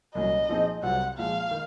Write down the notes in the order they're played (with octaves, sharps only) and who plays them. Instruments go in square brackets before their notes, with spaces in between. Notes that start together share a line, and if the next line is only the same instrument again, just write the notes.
[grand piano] C2 A#2 F#3 C#4 [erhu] D#5
[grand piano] A#2 F3 C4 D#4 G#4
[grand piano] C2 C3 F#3 C4 F4 [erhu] F#5
[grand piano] A#2 F3 G#3 [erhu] F5
[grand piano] D#3